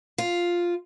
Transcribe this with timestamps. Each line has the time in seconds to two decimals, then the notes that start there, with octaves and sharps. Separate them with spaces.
0.18 F4